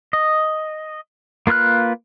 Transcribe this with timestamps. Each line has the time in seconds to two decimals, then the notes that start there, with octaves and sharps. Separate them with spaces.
0.13 D#5
1.47 A#3 F4 B4 F6 F#6